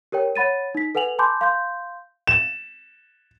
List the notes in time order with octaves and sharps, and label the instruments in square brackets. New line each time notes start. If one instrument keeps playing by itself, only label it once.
[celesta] G4 A#4 C#5 G5
C#5 F#5 B5 A6 D#7
D#4 B6
A4 B4 F#5 G#5 F7 F#7
G#5 A5 B5 C6 D6 G6
F5 C6 G6
[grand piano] E7